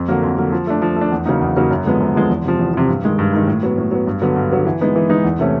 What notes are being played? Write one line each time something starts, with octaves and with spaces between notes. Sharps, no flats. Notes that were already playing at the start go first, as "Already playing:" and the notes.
Already playing: F2
D3 F#3 A#3
F2
D3 F#3 A#3
F3
A3 D4
F3
A3
D4
E2
C#3 F#3 A#3 D#4
E2
C#3 F#3 A#3 D#4
F#2
D3 F3 G#3 B3
F#2
D3 F3 G#3 B3
E2
C3 F3
E2
C3 F3
G2
D#3 G#3
G2
D#3 G#3
A2
F#3 B3
A2
F#3 B3
G2
D3 F#3 B3
G2
D3 F#3 B3
E3
G#3 B3 D#4
E3
G#3 B3 D#4
E2
C3 E3 A3 C#4